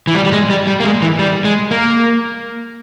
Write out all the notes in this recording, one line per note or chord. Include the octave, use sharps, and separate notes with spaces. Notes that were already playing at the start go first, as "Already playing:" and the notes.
E3
G3
G3
G#3
G3
G3
A#3
G#3
E3
G3
G#3
A#3